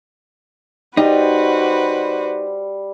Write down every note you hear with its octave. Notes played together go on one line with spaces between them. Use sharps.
G3 D#4 F#4 B4 C5